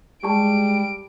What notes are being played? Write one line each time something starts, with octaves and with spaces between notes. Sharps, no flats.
G3 G#3 G4 A5 D7